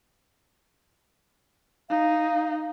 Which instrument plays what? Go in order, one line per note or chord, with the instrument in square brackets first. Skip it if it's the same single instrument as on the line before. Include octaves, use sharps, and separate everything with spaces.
[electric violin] D#4 [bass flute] F5